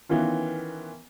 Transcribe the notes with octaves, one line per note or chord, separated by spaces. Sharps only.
D#3 E3 B3 C#4 F4